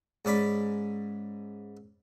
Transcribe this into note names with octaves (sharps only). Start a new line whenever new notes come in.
G#2 C#4 D5 B5